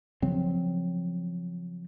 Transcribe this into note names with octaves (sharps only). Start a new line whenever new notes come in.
C#3 F3 F#3 C4